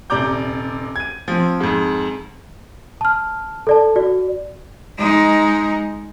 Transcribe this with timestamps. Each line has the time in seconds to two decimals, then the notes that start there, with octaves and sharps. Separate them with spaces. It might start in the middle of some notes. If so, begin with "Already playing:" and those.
0.10 D#1 C3 D5 A#5 D6 G6
0.96 G#6 D#7
1.28 F3 C4
1.60 F2 G#2
3.01 A5 F6
3.67 A4 D5 A5
3.96 F#4 D5
4.99 G#3 D#4